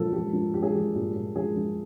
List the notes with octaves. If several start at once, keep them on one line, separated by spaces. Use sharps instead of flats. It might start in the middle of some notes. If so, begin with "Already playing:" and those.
Already playing: A#2 F3 A4
F3 G4
F3
F3 G4
G#4
F3 G4
A#2 G4
A#2
F3 G#4
F3